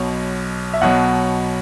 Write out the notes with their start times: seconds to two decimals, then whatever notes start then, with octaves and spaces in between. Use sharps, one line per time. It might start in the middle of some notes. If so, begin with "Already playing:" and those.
Already playing: B1 B2 F#3
0.74 E5
0.81 B1 B2 F#3 F#5